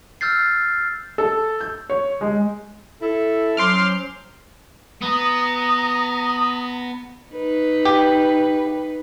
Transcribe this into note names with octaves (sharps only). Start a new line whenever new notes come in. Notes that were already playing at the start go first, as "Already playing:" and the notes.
E6 F6 G6 A6 C7
A4
G6
C#5
G#3
E4 A4
F#3 C#4 C5 C6 D6 F6
B3 A#5 D#6
D#4 B4
G4